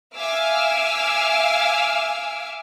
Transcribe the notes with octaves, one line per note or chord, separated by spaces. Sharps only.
E5 F5 G#5 D6 E6 F6